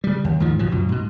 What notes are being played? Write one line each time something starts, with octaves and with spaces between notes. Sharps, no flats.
C#3 G3
D#2
G#2 D#3 F3
C#2 B2 F3
F#2 B2
G#2 B2